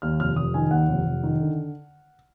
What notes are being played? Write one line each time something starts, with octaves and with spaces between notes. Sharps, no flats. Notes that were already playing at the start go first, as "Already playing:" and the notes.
D#2 F6
F1 F6
F1 D#6
D#3 G#5
D#2 F#5
F1
F1
D#3
D3